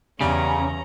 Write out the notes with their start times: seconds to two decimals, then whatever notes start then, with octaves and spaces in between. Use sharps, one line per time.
0.21 E2 C#3 G3 C#4 A#5